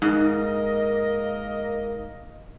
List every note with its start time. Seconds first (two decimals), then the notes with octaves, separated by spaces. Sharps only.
0.02 G#2 A#3 A#4 D#5